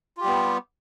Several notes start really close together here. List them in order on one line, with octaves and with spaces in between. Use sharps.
F4 G4 G3 B3